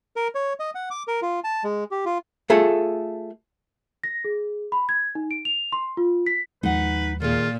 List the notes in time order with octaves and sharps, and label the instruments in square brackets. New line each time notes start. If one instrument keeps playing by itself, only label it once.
[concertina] A#4
C#5
D#5
F#5
D6
A#4
F4
A5
G#3
G4
F4
[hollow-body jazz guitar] A3 F4 G#4 A4
[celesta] A#6
G#4
B5
G#6
D#4
D7
F7
C6
F4
B6
[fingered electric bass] D#2 F3 G#3 [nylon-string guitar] D#4 F#5 [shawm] B4
[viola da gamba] A#2 [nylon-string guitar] D#3 G#4 [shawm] F4